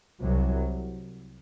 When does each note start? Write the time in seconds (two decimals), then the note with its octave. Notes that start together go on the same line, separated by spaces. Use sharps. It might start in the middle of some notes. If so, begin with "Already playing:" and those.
0.20 C2 C3 F#3